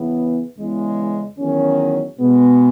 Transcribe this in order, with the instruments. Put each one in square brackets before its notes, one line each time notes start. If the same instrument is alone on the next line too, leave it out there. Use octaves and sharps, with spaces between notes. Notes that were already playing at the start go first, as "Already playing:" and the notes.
Already playing: [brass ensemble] E2 C#3 E3 B3
E2 C#3 G#3
E2 D#3 F#3 C#4
B2 G#3 B3